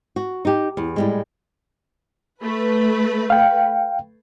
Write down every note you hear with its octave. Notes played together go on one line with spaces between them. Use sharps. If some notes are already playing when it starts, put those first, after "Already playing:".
F#4
D#4 G4
E2
A2 G3 G#3
A3 B4
F5 G5